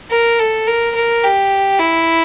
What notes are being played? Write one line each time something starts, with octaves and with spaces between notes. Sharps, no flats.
A#4
A4
A#4
A#4
G4
E4